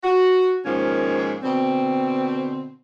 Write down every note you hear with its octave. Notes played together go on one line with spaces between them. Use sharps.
F#4
G#2 D#3 F3 A#3 C#4
B2 D3 C4